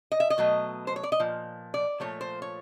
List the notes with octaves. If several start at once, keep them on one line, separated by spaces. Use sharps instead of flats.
D#5
E5
D#5
B2 F#3 A3
C5
C#5
D5
D#5
A#2 F3
D5
A#2 F3 A3 C#5
C5
C#5